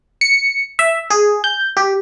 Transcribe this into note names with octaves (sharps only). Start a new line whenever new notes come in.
C#7
E5
G#4
G6
G4